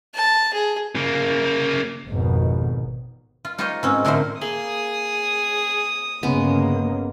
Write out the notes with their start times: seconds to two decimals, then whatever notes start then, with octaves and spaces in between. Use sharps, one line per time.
0.14 A5
0.53 G#4
0.95 C#3 A#3
2.06 G#1 F2 G#2 B2 D#3
3.45 F4
3.58 D#4 F4 G4 C5 C#5 D#5
3.83 G#2 C4 C#4
4.05 A2 D3 A3 A#4 C5
4.41 A#3 G#4 D#6
6.23 G1 C#3 G#3 A#3 B3